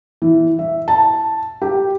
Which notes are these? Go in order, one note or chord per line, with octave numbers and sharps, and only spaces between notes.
E3
E5
A5
G4